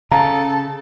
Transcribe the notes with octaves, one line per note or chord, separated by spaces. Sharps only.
C#3 C#4 A4 F5 A#5